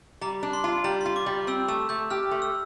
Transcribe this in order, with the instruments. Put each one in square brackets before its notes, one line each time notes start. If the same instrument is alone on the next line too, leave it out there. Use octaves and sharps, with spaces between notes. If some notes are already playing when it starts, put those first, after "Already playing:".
[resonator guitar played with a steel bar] G3 [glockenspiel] A#5
[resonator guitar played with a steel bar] D4
[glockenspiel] C6
[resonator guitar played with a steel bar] F4
[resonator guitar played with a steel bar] G3 [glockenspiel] A#5
[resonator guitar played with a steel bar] F4 [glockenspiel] C6
[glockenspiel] D6
[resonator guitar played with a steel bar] G3
[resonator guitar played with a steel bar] C4 [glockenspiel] E6
[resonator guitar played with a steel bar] A3 [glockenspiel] E6
[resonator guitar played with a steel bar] A3 [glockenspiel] G6
[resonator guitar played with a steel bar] G4 [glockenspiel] F6
[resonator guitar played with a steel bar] A3
[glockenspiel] E6